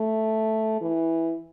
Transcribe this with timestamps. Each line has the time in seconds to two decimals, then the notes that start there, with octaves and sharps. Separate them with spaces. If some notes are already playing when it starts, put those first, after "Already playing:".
Already playing: A3
0.81 E3